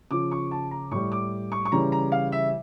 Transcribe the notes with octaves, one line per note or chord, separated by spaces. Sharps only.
C#3 F3 D6
C#6
A5
A#5
A2 G3 C#6
D6
C#6
C#6
C#3 E3 G3 A#5
A#5
F5
E5